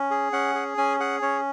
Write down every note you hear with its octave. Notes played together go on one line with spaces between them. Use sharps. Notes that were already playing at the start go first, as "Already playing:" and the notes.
Already playing: C#4
G#4
C#4 F#5
G#4
C#4 G#5
G#4 F#5
C#4 C#5